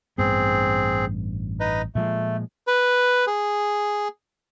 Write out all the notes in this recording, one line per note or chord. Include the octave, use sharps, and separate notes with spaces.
A1 G2 B3 C4 G#4
D#4 B4 D#5
A#2 F3 G#3 A3
B4
G#4